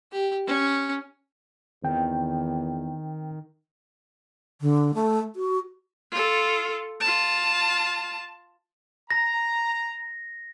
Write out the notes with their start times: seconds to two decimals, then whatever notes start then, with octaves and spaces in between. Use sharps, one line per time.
0.12 G4
0.47 C#4
1.84 E2 D#3 C4 G5
4.61 D3
4.94 A3
5.36 F#4
6.11 F4 A4
7.01 F4 A5
9.10 A#5 A#6